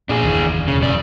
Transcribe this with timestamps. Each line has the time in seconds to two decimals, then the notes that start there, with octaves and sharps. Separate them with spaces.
0.09 A#2 D4 G#4
0.23 F#1 D#2 E3
0.68 E1 C#3
0.81 F#2 D5